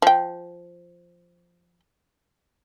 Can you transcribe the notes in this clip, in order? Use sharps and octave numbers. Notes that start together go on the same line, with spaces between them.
F3 G5